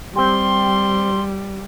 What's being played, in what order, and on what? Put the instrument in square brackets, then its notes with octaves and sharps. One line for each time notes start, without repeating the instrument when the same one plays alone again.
[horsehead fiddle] G3 [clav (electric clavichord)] C4 G4 [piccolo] C6